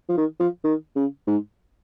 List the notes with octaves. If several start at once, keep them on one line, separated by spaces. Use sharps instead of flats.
F3
D#3
F3
D#3
C#3
G#2